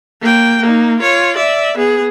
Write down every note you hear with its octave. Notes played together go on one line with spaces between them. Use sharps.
A#3 G5
A#3 D#4
F4 C#5
D5 E5
B3 G#4